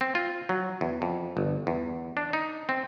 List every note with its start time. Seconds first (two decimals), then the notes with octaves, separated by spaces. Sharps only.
0.01 C4
0.15 F4
0.49 F#3
0.81 E2
1.02 F2
1.37 G1
1.67 E2
2.17 D4
2.33 D#4
2.69 C4